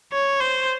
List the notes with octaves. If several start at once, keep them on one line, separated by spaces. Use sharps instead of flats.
C#5
C5